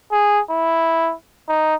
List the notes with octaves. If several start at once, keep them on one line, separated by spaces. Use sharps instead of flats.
G#4
E4
D#4